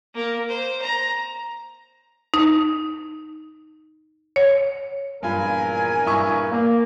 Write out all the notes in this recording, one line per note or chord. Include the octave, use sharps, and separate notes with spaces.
A#3 A#4
C5
A#5
D#4
C#5
A#1 E2 G2 F4 A#4 G#5 B5
G2 E4 C#6
A#3